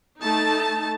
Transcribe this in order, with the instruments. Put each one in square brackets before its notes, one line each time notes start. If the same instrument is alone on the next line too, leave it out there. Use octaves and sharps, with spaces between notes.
[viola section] A3 D#4 A5